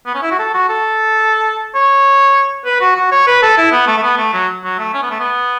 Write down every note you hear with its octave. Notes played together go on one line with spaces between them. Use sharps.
B3
C#4
E4
F#4
A4
F#4
A4
C#5
B4
F#4
F#4
C#5
B4
A4
E4
B3
A3
A3
B3
A3
F#3
F#3
A3
C#4
B3
A3
B3